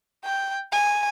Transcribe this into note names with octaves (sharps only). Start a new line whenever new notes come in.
G5
G#5